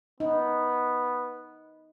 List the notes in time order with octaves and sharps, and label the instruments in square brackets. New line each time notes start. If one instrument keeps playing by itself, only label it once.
[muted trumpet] B3 [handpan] D#4